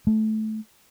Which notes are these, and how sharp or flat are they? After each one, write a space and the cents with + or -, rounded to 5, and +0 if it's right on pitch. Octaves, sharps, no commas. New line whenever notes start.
A3 -15